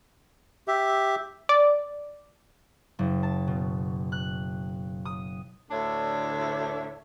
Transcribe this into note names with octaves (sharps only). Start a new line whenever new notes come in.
G4 E5
D5
F#1
A5
B2
F#6
D#6
D2 A2 D3 D4 C#5 E5